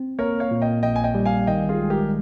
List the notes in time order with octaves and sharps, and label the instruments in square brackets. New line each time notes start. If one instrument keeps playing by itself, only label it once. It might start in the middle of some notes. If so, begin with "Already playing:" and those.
Already playing: [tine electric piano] C4
[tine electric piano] A#3 [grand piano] A#4 C#5
[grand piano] C#5 F5
[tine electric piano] A#2
[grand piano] D#5 G5
[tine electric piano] A#1 [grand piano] D#5 G5
[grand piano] G#5
D#5 G5
[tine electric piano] G3
[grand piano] F5 G#5
[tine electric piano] D#3 [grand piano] D#5 G5
[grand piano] F4 G#4
[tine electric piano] G#3
[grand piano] G4 A#4